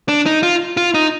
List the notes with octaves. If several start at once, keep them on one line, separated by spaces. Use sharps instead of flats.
D4
D#4
F4
F4
D#4